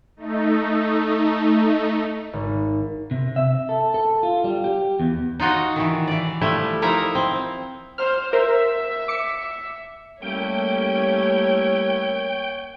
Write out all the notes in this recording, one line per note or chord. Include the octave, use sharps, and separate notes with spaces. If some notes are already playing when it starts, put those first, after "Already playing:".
A3 D#4
G#1
C3
E5
A4
A4
F4
G3
G4
E2
D#4 F4 F#4 D#5
D#3 E3
E3 D5
F3 G3 A3 E4
F3 D#4 E4 A#4 A#5
C4
C5 F6
A#4 C5 E5
D6 C#7
G3 A3 A#3 C#4 E4 C#5 G5